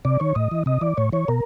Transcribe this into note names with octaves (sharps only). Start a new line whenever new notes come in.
C3 D5
D#3 C#5
A2 D#5
E3
C3 D#5
E3 D5
A2 C#5
E3 C#5
B2 A#4